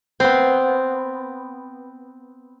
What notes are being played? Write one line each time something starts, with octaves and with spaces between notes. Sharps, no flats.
B3 C4